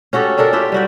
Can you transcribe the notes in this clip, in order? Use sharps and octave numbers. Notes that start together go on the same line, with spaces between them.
C#4 F#4 G4 A4
C#4 D4 A4 A#4
D4 F4 G4 E5
G3 F#4 G5